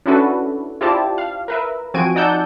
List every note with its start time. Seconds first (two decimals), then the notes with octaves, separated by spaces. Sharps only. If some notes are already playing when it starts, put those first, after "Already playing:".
0.06 C#4 D4 E4 F#4 A4 B4
0.81 E4 F4 G4 C5 D5 A5
1.18 F5
1.48 A#4 B4 E5
1.94 F3 C4 F#4 G#5 D7 D#7
2.16 D#4 D5 F#5 A5 E6 G6